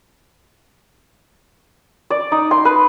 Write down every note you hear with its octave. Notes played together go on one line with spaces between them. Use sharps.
D5
D#4
C6
B4